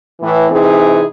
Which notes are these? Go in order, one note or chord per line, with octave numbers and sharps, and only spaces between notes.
A2 E3
C3 E3 C4 D#4 G#4